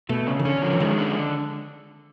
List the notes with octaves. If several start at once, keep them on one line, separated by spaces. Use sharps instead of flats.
B2 A3
C#3
D#3
D3 C#4
F3
E3
D#3 G#3
D3